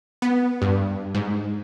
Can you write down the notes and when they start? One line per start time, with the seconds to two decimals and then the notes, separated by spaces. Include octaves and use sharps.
0.22 B3
0.62 G2
1.15 G#2